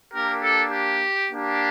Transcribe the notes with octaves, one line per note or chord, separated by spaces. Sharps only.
A#3 D4 G4 A#4
A4
G4
A#3 D4 G4